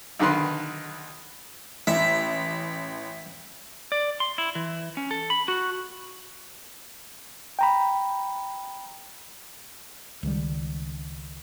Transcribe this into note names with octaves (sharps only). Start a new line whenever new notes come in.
B1 D3 D#3 B4 C6
A1 E5
D5
C6
E4
E3
C#4
A4
B5
F#4
G5 A#5 B5
C#2 D#3 G3